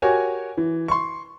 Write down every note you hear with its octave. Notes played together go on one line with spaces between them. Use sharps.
F#4 G4 A#4 C#5 G#5
E3
C6 C#6